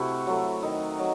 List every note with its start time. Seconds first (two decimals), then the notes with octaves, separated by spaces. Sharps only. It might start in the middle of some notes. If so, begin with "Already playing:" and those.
Already playing: C3 A3 E4 F#4
0.27 F#3 A3
0.63 D#3 D#4
0.99 F#3